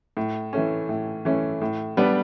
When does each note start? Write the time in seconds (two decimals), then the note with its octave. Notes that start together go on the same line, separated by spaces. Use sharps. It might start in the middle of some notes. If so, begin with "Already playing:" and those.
0.17 A2
0.53 E3 A3 C#4
0.89 A2
1.25 E3 A3 C#4
1.62 A2
1.97 G3 B3 D4